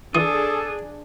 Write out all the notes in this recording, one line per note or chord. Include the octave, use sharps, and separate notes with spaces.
E3 D4 G#4 A4 D#6